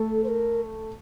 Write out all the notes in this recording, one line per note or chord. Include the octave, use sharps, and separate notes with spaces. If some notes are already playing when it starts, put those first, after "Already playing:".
Already playing: A3 A4
C5
A#4